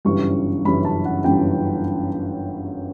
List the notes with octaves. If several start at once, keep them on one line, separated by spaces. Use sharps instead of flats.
G1 F#2 C#3 E3 G3 C#6
G1 F#2 C#3 E3 G3 B5
A5
F#5
G1 F#2 C#3 E3 G3 G5